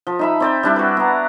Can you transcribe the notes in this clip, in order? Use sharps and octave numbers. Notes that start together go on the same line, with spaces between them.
F3
D#4 E5 B5
C4 D5 G5
G3 D4 E4
F#4 B4
B3 A#5